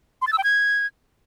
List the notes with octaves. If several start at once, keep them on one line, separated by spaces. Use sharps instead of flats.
C6
A6
E6
G5
G#6